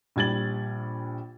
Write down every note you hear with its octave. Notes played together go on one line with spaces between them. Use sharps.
A#1 G3 G#6 A6 F#7